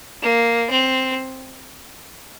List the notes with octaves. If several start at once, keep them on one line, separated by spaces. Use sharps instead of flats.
A#3
C4